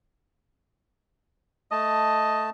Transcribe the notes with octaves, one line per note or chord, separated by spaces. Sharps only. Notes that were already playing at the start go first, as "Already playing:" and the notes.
A3 D#5 A5